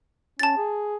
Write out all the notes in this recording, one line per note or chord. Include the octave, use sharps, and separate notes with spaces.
C#4 A5 A6
G#4